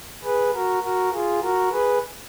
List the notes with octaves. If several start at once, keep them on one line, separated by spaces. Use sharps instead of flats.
G#4 B4
F#4 A#4
F#4 A#4
F4 G#4
F#4 A#4
G#4 B4